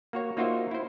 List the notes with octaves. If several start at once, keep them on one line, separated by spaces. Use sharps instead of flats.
A#3 F#4 C#5
A#3 D#4 F4 F#4 C5 E5
E4 C5